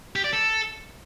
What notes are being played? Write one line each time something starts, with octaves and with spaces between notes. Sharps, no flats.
G4
D5
A4